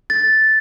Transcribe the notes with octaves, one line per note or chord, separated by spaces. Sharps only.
A6